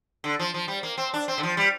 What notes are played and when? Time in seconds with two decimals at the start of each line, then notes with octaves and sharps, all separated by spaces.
0.24 D3
0.39 F3
0.54 F3
0.68 G3
0.83 A#3
0.98 C4
1.14 D4
1.28 C4
1.38 D3
1.43 F3
1.57 G3